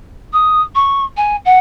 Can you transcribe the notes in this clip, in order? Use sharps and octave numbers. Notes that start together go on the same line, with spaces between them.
D#6
C#6
G#5
F#5